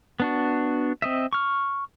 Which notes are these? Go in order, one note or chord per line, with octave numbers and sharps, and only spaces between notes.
B3 D4 F#4
C4 D#5 E5
C#6 F6